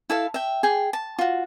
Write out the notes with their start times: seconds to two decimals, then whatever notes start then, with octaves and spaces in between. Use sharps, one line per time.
0.10 E4 A4 F5
0.34 E5 G5
0.63 G#4 G5
0.93 A5
1.19 F4 F#4